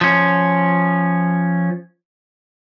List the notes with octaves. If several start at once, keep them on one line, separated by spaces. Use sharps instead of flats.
F3 C#4